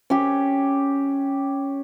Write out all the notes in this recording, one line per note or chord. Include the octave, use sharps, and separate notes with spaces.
C#4 G4